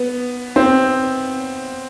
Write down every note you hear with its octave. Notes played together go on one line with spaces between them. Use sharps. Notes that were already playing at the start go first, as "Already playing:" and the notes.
Already playing: B3
C4